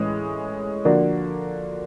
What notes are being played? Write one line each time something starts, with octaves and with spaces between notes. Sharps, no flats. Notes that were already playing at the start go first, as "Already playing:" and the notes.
Already playing: A2 E3 G#3 C#4
D3 F3 A#3 D4 F#4